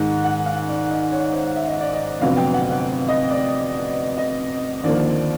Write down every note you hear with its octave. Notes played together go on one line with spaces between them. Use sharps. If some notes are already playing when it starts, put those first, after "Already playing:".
Already playing: G#2 D#3 G#3
F#5
F5
D5
D#5
C#5
C5
E5
D#5
D5
D#5
F1 F2 D3 F#3 B3 F5
G5
F#5
F#5
D#5
D5
D#5
D#2 D3 F3 A#3 D5
D5